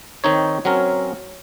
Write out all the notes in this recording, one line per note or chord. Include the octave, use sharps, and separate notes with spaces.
D#3 C4 D#4 C#5
F#3 C4 C#4 A#4